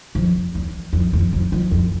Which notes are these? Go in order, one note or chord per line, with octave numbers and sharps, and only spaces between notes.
F2
E2
F2
F2
F2
F2
F2